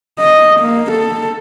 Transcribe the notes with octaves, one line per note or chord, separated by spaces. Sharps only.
D#5
A#3
A4